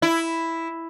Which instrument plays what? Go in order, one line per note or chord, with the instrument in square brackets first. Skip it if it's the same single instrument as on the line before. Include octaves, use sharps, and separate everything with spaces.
[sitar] E4